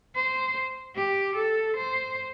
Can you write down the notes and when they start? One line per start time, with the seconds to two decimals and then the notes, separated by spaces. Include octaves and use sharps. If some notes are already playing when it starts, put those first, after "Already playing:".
0.15 C5
0.95 G4
1.35 A4
1.76 C5